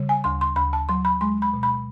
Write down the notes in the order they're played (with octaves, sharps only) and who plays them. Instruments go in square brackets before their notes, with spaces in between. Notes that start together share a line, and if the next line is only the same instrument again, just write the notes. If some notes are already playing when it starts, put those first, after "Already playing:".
Already playing: [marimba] C#3 G3
G#5
D2 C6
C6
D2 B5
A5
F#3 C6
B5
G#3 C6
B5
B2
B5